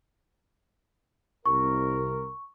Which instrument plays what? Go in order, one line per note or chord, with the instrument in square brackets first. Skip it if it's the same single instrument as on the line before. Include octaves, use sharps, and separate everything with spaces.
[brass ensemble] C2 A#4 [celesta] C#6